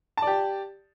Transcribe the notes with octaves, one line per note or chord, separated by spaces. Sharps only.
G4 D5 A5